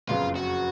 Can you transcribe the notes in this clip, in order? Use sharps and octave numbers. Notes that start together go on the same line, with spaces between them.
F#1 F2 C#3 F#3 B3 F4
F#4